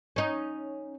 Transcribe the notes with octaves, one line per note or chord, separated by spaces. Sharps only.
C#4 D#4